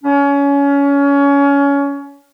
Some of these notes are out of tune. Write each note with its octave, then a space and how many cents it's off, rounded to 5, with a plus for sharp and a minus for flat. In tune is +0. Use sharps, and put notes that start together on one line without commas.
C#4 +25